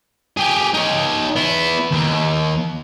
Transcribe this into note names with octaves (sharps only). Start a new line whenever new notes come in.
G4 G#4
D#4 C#5
B3 E4
D#2